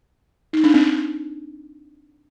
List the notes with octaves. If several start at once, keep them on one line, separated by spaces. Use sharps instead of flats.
D#4
D4
C4